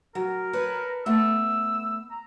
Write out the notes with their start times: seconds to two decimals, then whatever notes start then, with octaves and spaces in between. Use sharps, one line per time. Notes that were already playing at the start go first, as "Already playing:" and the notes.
0.15 F#3 A#4
0.53 B4 C#5 A5
1.06 A3 B3 E6
2.12 A#5